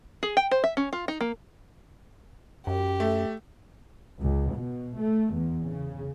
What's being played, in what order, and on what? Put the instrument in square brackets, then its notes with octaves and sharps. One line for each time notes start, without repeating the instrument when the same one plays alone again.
[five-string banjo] G#4
G5
C5
E5
C#4
F4
D#4
A#3
[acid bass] F#2 [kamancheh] G4
[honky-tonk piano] A3
[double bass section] C#2
B2
A3
E2
C#3